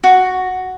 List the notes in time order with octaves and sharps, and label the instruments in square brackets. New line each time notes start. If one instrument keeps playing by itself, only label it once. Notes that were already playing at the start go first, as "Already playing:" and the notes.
[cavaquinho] F#4